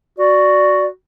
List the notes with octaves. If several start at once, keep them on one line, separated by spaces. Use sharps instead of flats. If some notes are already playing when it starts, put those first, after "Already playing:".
F#4 D5